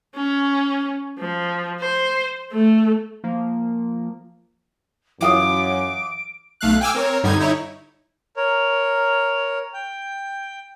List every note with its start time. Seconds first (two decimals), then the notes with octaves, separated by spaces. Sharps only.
0.15 C#4
1.19 F3
1.80 C5
2.52 A3
3.24 F3 A#3
5.21 F#2 E3 F4 D6 D#6 D7
6.61 B1 A3 F5 F#6
6.81 G5 G#5 D6 E6 F6
6.94 C4 A#4 C#5
7.23 G2 D3 G3 D#4 G#6
7.40 D#4 E4 C#5
8.37 A#4 C#5
9.74 G5